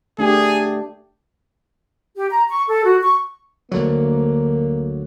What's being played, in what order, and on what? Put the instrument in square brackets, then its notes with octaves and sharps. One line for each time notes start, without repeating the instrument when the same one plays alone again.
[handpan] A3 D4 G4 [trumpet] G#4
[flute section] G4
A#5
C#6
A4
F#4
C#6
[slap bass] D2 D3 F#3 [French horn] A#3